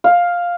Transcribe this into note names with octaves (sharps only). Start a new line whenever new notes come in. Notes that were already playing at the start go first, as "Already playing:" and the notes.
F5